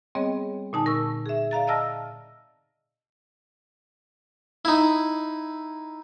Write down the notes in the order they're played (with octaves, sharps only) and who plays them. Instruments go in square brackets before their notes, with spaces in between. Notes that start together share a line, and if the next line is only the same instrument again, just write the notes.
[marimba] G3 B3 C4 G#4 C#5 D#5
A#2 D3 D#4 G#5 A5
A#4 C#6 E6
G#4 E5
D5 F5 A#5 A6
D5 D#5 A5 E6 F6 A#6
[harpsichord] D#4 E4